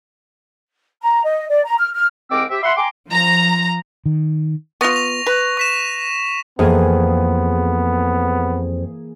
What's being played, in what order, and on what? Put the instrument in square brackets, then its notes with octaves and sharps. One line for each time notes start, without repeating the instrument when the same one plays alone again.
[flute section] A#5
D#5
D5
A#5
F6
F6
[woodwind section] C2 G#2 C4 A#4 D6 E6
C4 G4 E5
E5 F#5 B5 C6
G5 G#5 A#5 C6 D6
[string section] F3 A#5
[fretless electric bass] D#3
[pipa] B3 F4 [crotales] C#6 A#6 F7
[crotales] F7
[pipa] B4
[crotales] C#6 B6 E7
[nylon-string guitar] F2 [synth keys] E3 A#3 G#4 [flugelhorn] B3